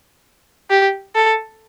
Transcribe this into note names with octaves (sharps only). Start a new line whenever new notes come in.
G4
A4